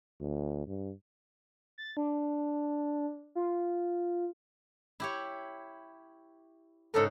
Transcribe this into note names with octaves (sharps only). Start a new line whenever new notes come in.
D2
G2
A6
D4
F4
E4 G4 C#5
G#2 C#3 A4 A#4